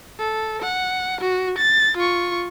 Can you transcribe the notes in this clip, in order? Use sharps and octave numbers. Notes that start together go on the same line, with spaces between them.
A4
F#5
F#4
A6
F4 C#6